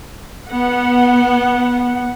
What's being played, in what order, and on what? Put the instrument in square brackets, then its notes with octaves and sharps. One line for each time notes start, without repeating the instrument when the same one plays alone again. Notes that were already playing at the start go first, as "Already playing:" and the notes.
[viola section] B3 F#5